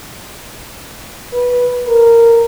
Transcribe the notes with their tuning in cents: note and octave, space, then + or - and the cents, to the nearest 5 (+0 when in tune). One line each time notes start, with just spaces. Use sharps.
B4 -10
A#4 -10